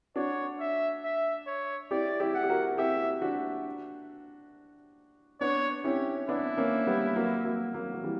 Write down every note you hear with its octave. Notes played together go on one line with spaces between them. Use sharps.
D4 F#4 C#5
E5
E5
C#5
E4 G4 D5
E4 G4
F#5
G4
F#4 A#4
E4 G4 E5
D4 F#4
B3 D4 C#5
C#4 E4 G4
B3 D4 E4
A#3 C#4
G3 B3
F#3 A#3
F#3 A#3
F#3 A#3
F#3
E3 G3